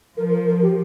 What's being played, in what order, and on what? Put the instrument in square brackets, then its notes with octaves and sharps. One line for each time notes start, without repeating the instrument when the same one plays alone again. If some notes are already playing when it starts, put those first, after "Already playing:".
[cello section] F3 [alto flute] A#4
[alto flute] A#4
A#4
G4